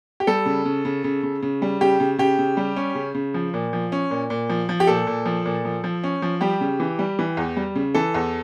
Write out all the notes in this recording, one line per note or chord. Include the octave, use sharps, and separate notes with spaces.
G4
G3 A4
C#3
C#3
C#3
C#3
C#3
C#3
G3
C#3 G4
C#3
C#3 G4
C#3
G3
C#4
C#3
C#3
F3
A#2
F3
C#4
A#2
A#2
F3
F3
G4
A#2 A4
A#2
F3
A#2
F3
F3
C#4
F3
G3 G4
C#3
E3
G3
E3
E2
G3
C#3
E3 A4
E2